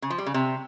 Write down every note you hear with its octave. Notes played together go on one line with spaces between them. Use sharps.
C#3
F3
G3
C#3
C3